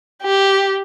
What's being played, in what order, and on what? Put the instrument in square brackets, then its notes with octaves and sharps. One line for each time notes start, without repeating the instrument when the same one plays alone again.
[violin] G4